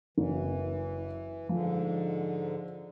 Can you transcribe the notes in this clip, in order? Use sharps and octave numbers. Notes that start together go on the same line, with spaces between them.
F#1 E3
G#2 D3 F3